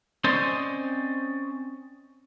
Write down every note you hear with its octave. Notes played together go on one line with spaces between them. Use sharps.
C4 C#4 C5 D5 D#5 C6